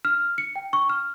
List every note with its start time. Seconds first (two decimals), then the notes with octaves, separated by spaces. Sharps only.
0.05 F6
0.38 C#7
0.56 G5
0.73 C#6
0.90 F6